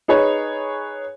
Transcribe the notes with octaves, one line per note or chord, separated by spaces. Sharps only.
D#4 G#4 B4 C#5